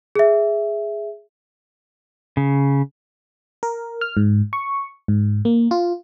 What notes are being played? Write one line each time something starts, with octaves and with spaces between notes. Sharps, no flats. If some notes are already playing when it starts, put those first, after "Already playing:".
G#4 E5
C#3
A#4
F6
G#2
C#6
G#2
A#3
F4